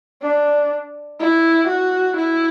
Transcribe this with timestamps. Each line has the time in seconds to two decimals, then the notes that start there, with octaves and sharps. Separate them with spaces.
0.22 D4
1.20 E4
1.68 F#4
2.17 E4